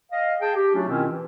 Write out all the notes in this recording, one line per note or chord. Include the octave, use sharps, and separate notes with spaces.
D#5 F5
G#4 G5 A5
G4
F#3 A3 C#4 D4 F4 F#4
B2 D#3 C4 C#4 E4 F4
E3